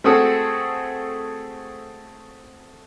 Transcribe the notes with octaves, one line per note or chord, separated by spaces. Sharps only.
A3 C4 F#4 G#4 A4